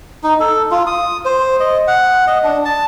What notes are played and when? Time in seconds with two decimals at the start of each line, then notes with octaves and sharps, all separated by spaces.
0.24 D#4
0.40 A4
0.71 F4
0.87 D#6
1.25 C5
1.60 D#5
1.87 F#5
2.27 D#5
2.44 D4
2.65 A5